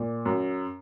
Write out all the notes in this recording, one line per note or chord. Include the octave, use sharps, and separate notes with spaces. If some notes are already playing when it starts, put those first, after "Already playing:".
Already playing: A#2
F#2